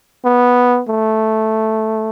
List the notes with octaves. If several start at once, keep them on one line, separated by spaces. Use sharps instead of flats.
B3
A3